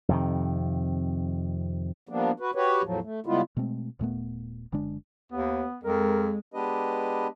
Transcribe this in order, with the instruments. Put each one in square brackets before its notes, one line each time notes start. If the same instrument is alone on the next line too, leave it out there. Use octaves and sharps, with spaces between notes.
[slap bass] F2 C3 D#3
[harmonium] F3 G3 A#3 B3 D4
F#4 B4
F#4 G4 B4 C#5
E2 A2 F3 F#3
A3
C#3 G3 G#3 B3 E4 F4
[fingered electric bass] B2 G#3 A3 C4
D#1 A#2 A3 B3
F#1 D3 G#3 D4
[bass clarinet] D#2 [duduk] B3
[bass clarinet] F2 [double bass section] G#3 [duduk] A#4
[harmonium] G#3 B3 D4 G4 B4 D#5